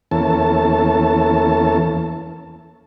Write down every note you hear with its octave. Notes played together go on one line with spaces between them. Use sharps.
E2 E3 A#3 C#4 A4 A5